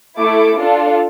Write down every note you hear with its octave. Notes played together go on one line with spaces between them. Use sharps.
A3 E4 A4 D6
D4 F4 A4